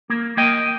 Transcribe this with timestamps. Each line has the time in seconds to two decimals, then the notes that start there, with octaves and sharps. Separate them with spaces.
0.10 A#3
0.37 A#3 D#5 G5